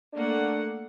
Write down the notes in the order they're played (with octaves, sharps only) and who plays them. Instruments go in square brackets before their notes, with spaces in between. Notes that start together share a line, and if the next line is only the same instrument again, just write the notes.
[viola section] A3 A#3 F#5 [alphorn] D4